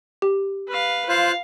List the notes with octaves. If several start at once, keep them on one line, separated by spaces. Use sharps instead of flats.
G4
B4 F5
F4 C5 F5 F#6